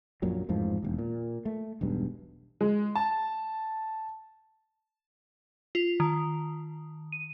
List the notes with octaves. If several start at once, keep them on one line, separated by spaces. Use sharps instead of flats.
A#1 F#2 A#2 F#3
A1 F2 G#2 F3
E1 D#2
A#2
A3
E1 B1 G2
G#3
A5
F4
D#3
D#7